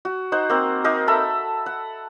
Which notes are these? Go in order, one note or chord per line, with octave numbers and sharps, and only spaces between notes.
F#4
D#4 C5 F#5
A#3 C4
A#3 D#4 A#4 C6
A4 E5 A#5 B5
F#5